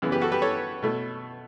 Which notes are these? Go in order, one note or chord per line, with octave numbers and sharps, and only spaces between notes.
F#2 C#3 E3 B3
G4 B4
F#4 A4
G4 B4
A4 C#5
B2 A3